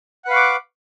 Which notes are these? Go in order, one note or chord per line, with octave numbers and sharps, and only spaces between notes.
B4 F5 F#5 C#6 D6